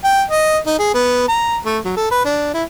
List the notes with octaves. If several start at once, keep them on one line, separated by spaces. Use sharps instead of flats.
G5
D#5
D#4
G#4
B3
A#5
A3
F#3
A4
B4
D4
E4